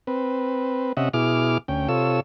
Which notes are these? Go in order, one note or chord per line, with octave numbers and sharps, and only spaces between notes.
C4 B4
C3 C#4 D#5 E5 F#5
B2 E4 G#4 D6 F6
D2 C#4 G5
C3 F4 A4 C#5 E6